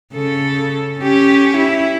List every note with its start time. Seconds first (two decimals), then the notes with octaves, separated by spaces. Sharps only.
0.14 C#3 A4
0.99 C#4 G4
1.57 E4